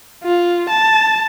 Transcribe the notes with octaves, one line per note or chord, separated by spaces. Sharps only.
F4
A5